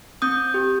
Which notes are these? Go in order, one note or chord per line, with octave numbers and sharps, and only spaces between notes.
C4 D#6 G6
G4